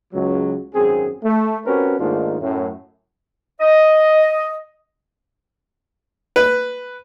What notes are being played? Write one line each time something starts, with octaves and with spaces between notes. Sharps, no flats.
C#2 F#3
G#1 F#2 C4 G#4
A3
C4 C#4 F#4 G4 A#4 B4
G#2 D#3 A3 A#3 D4 F4
F#2 A2
D#5
B4